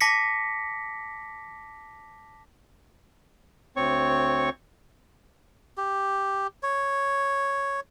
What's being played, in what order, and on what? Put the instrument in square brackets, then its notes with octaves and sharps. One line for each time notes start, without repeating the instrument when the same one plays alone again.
[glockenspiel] A5 D6 A#6 B6 C#7
[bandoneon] D2 C4 C#5 C#6
[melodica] G4
C#5